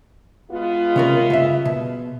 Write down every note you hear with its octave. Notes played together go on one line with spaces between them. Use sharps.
G#3 B3 F4
C3 C#4 A#4
C#2 G2 E5
B2